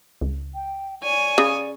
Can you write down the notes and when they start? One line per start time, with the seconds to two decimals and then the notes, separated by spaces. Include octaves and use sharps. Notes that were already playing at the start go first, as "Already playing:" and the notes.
0.21 C#2
0.55 G5
1.03 C#5 D5 G#5
1.38 C#3 D#6